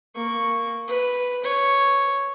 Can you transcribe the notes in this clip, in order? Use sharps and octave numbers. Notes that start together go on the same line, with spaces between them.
A#3 C#6
B4
C#5